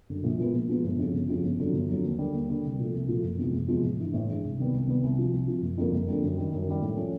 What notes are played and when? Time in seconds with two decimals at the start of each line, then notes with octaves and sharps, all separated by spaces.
0.10 F#2 D3 G3
0.24 A#1
0.39 A#2 F3 G#3 B3
0.53 A#1
0.68 A#2 F3 G#3 B3
0.84 G1
0.99 F2 C#3 F3
1.13 G1
1.29 F2 C#3 F3
1.43 G1
1.59 F2 D3 F#3
1.73 G1
1.88 F2 D3 F#3
2.04 D#2
2.18 D3 G3 A#3
2.33 D#2
2.48 D3 G3 A#3
2.63 C2
2.79 A#2 F3 A3
2.94 C2
3.08 A#2 F3 A3
3.23 F#1
3.38 E2 C3 F3 G#3
3.53 F#1
3.68 E2 C3 F3 G#3
3.84 A1
3.99 G2 E3 G#3
4.14 A1
4.27 G2 E3 G#3
4.43 C2
4.58 C3 D#3 G3 B3
4.73 C2
4.87 C3 D#3 G3 B3
5.03 C2
5.18 C3 F3
5.33 C2
5.48 C3 F3
5.62 F#1
5.78 F2 D3 G3 A#3
5.92 F#1
6.08 F2 D3 G3 A#3
6.22 F#2
6.37 D#3 G3
6.53 F#2
6.68 D#3 G3
6.82 A2
6.97 F3 A3 C#4